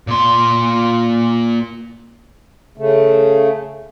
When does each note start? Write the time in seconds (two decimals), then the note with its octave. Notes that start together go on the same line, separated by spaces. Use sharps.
0.07 A#2 C6
2.77 C#3 A3